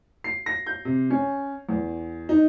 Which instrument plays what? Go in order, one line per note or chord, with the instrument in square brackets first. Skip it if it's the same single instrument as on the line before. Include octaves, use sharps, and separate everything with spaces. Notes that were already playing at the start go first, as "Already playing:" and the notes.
[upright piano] C7
A#6
G6
C3
C#4
E2
D#4